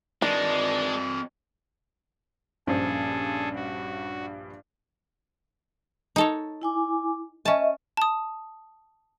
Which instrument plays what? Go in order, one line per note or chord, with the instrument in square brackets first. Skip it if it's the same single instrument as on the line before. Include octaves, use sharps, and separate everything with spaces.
[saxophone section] D#3 E3 D5 [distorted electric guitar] G#3 [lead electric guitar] C4 D#5 [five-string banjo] D4
[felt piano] A#1 G2 C5 [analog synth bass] C#4 [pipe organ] G#4 A4
[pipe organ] F#4
[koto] D#4 A4 C#5
[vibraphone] E4 G#5 D6
[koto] C#4 A5 [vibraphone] D#5 E5 C#6
[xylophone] A5 D#6